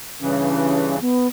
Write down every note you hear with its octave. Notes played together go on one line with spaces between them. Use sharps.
G2 C#3 E3 C#4
B3